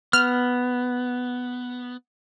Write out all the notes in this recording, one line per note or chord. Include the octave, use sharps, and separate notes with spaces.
B3 F6